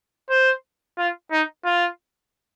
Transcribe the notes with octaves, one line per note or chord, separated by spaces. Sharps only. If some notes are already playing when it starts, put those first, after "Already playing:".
C5
F4
D#4
F4